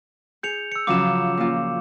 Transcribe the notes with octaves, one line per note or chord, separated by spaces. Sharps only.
G#4 G6 C#7 F7
E6 C#7
C#3 F3 F#3 D6 E7
A#2 C#4 F4